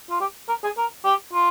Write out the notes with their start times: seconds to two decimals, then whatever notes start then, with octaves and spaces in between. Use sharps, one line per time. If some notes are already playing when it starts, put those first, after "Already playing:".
0.10 F4
0.21 G4
0.49 A#4
0.64 G#4
0.77 A#4
1.05 G4
1.33 F4